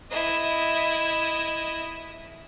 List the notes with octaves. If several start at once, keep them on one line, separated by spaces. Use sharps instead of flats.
E4 D#5